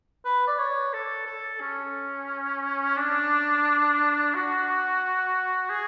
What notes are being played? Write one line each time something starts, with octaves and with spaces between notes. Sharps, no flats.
B4
D5
C#5
A4
A4
C#4
D4
F#4
G#4